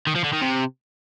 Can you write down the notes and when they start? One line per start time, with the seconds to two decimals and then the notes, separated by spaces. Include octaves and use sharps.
0.07 D#3
0.16 F3
0.24 D3
0.33 D#3
0.41 C3